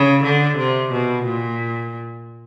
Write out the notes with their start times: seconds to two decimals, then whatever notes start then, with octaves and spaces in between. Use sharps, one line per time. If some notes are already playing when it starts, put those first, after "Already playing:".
Already playing: C#3
0.24 D3
0.58 C3
0.92 B2
1.25 A#2